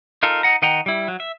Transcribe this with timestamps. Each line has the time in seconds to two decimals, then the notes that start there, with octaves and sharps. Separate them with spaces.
0.23 D#4 F4 A4 A#4
0.43 D#4 F#5 A#5
0.62 D#3 D#5 F#5 G5 A#5
0.86 G3 E4
1.08 F#3
1.20 E5